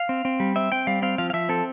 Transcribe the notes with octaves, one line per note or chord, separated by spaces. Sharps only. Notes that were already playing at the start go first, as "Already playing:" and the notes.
Already playing: F5
C4
C4
G3
C4 E5
C4 G5
G3 F5
C4 F5
F3 F5
F5
F3 E5
C4 A4